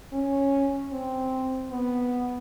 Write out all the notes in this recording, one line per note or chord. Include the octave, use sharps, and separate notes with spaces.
C#4
C4
B3